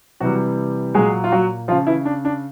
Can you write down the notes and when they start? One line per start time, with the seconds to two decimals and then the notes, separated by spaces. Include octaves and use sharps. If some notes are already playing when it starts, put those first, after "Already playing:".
0.20 C3 E3 F#3 G3 F#4
0.94 A#2 F#3 G#3 G#4
1.24 F4
1.32 F#3 F#4
1.68 C#3 F3 F4
1.87 E3 E4
2.05 D4
2.25 D4